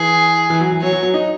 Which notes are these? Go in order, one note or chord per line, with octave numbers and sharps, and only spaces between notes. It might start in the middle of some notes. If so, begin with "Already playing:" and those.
Already playing: E3 G#4
E3
F#3
E3
F#3 C#5
F#3
F#3
D#4